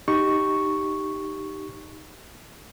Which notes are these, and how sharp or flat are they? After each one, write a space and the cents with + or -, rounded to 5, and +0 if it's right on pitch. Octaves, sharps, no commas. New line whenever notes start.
D#4 +0 G4 -5 C#6 +0